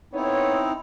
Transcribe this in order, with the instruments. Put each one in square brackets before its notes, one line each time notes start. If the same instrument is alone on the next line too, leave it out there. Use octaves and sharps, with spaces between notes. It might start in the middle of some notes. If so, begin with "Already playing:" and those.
[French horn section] B3 A4 C#5 [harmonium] C4 D#4 E4